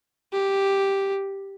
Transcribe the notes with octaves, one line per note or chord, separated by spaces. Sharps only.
G4